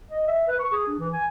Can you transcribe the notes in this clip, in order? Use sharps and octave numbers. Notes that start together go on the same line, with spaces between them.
D#5
E5
B4
C#6
G#4
D4
E3
G#5